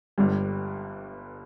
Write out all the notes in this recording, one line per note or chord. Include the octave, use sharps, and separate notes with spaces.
G1 G2 G3